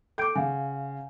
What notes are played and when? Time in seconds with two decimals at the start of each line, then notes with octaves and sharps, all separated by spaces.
0.18 A4 G5 D6 G6 D7
0.35 C#3 F5 F#5 G#5